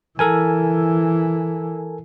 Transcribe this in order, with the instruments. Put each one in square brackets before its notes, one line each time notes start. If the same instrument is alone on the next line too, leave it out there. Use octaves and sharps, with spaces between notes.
[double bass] E3 [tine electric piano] A4 A#4 G#5